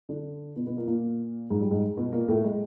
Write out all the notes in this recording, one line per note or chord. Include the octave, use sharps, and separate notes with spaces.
D3 D4
B2 B3
B2 B3
A#2 A#3
A#2 A#3
G#2 G#3
G3
G#2 G#3
B2 B3
A#2 A#3
A2 A3
G#3